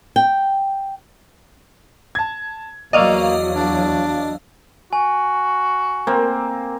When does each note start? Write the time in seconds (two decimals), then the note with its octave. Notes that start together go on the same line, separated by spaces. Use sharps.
0.16 G5
2.15 A5 G#6
2.93 E2 F#3 A#3 D5 D#5 F5 C#6 E6
3.56 D4
4.93 F#4 G#5
6.07 A#3 C4